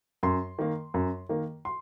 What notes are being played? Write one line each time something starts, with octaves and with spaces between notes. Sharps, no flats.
F#2 C6
D#3 A#3
F#2
D#3 A#3
C6